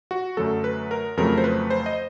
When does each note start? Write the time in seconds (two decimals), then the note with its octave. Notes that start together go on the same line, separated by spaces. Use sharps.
0.11 F#4
0.37 F#2 D3 F#3 A3 A4
0.64 B4
0.91 A#4
1.17 F2 C#3 F#3 A3 A#4
1.37 C5
1.44 B4
1.70 C5
1.86 D#5